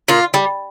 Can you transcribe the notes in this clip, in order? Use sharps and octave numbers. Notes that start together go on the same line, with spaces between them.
A#2 F4
G3